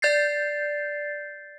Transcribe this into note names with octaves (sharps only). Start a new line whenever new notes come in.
D5 G6 A6 C7